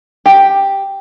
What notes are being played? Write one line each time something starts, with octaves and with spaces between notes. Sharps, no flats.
G4